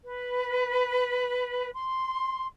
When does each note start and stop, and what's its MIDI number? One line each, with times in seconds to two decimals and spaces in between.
0.04 1.69 71
1.74 2.45 84